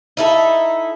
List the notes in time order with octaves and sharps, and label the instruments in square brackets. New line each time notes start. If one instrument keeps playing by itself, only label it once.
[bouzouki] D#4 E4 A4